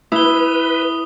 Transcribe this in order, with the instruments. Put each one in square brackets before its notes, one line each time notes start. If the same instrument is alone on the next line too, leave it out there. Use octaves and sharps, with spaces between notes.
[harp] E4 [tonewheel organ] B4 [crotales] D#6 G7